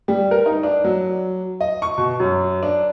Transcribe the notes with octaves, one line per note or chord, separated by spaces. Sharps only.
G3
A#4
D#4
D4
F#3
D#5
C#6
B2
F#2
D4